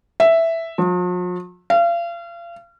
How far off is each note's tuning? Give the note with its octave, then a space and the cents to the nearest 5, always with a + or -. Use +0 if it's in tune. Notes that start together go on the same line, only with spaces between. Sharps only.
E5 +0
F3 +45
F5 -35